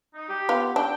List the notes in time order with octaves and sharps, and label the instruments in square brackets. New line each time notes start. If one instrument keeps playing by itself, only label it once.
[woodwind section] D#4
G4
[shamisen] B3 F4
[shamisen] D4 [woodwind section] G5